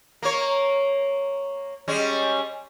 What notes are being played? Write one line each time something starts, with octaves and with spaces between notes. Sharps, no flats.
A#3 C#5
G3 G#3 C#4